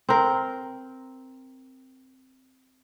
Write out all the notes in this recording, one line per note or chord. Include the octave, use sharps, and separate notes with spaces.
C4 A#4